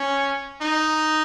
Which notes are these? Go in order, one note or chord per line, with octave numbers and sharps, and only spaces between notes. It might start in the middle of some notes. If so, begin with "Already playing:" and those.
Already playing: C#4
D#4